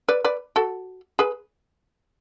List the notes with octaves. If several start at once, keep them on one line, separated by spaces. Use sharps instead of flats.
B4 D5
B4 D5
F#4 A4
G#4 B4